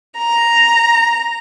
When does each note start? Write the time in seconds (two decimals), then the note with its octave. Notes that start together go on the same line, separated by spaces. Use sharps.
0.18 A#5